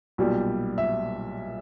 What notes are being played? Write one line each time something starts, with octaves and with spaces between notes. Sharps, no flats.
B1 A#2 G3
E5